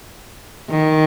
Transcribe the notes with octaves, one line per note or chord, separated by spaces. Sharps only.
D#3